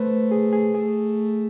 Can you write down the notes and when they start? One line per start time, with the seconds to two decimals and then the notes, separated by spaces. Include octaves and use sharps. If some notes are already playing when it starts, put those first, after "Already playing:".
Already playing: A3 B4 C5
0.31 G#4
0.53 G#4
0.74 A3 G#4